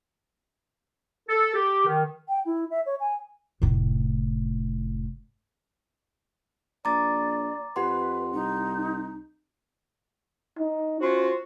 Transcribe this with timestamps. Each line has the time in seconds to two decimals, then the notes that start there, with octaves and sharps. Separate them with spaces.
1.28 A4
1.54 G4
1.86 D#3
2.29 G5
2.46 E4
2.71 E5
2.86 C#5
3.00 G#5
3.62 F1 A2
6.85 A#1 D5 A#5 D6 A6
7.76 F2 G4 B4 F#5 C6
8.33 C2 D#4
10.59 D#4
11.01 C#4 F4 F#4 C5